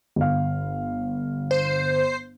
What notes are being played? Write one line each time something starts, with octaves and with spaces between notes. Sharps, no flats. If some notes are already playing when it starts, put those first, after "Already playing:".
G1 F5
C5